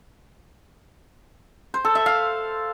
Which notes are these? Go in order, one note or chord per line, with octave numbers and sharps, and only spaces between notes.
C5
A4
E5
F5